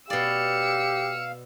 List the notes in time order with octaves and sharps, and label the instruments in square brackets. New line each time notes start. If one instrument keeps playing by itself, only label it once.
[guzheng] B2 D5 [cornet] G4 [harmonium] F5 [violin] E6 C#7